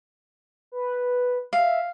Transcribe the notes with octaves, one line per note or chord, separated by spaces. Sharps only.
B4
E5 F5